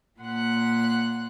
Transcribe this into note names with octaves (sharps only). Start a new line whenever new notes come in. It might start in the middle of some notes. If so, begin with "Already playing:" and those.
A#2 F#5 C6 F#6